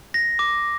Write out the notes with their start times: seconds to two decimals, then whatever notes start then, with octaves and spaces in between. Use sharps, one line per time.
0.14 A#6
0.39 D6